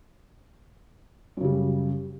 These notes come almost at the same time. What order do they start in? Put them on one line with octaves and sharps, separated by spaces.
F#2 C#3 G3